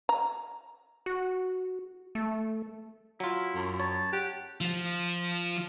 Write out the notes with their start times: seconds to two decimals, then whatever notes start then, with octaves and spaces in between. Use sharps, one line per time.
0.09 A#5
1.06 F#4
2.15 A3
3.20 F#3 E4 F4
3.55 F#2
3.80 C#5 A5
4.12 G4 F#5
4.61 F3 F4